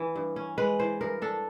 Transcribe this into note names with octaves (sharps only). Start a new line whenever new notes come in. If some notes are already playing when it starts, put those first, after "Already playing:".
Already playing: E3 C#4
G2
C#4
G#3 B4
E3 C5
G2 A#4
D4 A4